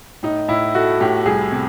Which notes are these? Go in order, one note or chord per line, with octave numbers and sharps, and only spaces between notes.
A2 D#4
A2 E4
A3 F#4
A2 G4
C2 G#4
C3